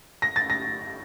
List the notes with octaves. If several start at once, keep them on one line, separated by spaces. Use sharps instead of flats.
A#6
A6
A#6